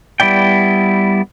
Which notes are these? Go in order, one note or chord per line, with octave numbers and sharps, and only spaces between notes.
G3 B3 E4 D5 G5